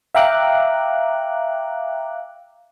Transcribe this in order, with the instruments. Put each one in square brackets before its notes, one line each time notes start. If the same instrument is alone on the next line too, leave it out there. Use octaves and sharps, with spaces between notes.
[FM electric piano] E5 F5 G5 A#5 D6 F#6